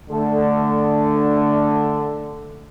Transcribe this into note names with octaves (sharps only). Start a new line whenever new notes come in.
D3 A3 A4